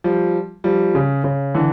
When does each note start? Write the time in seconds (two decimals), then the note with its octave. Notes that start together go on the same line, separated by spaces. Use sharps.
0.04 F3 G3
0.64 F3 G3
0.95 C#3
1.24 C#3
1.54 D3 E3